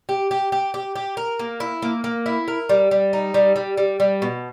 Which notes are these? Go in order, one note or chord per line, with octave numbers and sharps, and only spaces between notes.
G4
G4
G4
G4
G4
A#4
A#3
E4
A#3
A#3
E4
A#4
G3
G3
D#4
G3
G3
G3
G3
B2